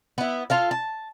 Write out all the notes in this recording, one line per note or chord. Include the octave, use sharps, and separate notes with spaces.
B3 E4
F4 A4 F5
A5